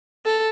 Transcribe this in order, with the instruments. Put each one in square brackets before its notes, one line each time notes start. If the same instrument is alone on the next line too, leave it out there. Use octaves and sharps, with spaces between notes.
[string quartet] A4